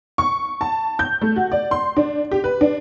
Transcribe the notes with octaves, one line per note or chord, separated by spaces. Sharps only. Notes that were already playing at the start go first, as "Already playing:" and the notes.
C#6
A5
G6
A3
F#4
D5
C6
D4
G4
B4
D4